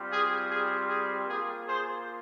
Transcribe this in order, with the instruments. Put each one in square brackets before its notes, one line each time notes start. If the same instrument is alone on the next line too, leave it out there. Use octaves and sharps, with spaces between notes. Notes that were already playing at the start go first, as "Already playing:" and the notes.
Already playing: [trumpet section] G3 C4 F4
G#4
G#4
G#4
A#3 F4 G#4
G#4 C5